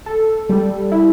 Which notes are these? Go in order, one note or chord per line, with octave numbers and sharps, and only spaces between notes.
A4
G3
E4